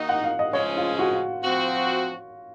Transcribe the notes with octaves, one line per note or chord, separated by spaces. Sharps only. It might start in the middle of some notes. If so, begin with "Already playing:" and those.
Already playing: D#3 A#3 D#4 F#4
F#5
F5
D#5
C#3 F3 G#3 C#4 C#5
F4
F#4
F3 C4 F#4